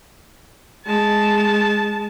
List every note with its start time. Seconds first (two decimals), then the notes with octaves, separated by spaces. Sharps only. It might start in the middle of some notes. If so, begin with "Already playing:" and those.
0.86 G#3 A5